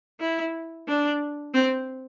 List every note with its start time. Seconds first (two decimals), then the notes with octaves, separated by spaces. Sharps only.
0.20 E4
0.88 D4
1.54 C4